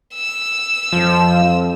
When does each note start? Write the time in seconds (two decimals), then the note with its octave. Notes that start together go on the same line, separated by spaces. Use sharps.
0.15 E6
0.92 F2 F3